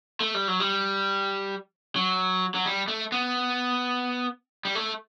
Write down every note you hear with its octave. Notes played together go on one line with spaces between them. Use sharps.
A3
G3
F#3
G3
F#3
F#3
G3
A3
B3
G3
A3